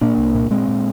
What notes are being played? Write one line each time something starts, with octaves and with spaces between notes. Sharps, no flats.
A#2 A#3 D4
C2
A#2
A#2 G#3 C4
A#2